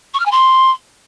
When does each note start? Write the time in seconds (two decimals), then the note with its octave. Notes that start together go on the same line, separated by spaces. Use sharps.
0.14 C#6
0.19 F6
0.25 G#5
0.31 C6